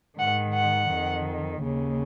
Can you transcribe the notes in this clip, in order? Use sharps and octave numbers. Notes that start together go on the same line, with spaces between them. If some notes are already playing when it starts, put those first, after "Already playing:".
G#2 D#3 F#5
F#5
F2 D#3
D#2 C#3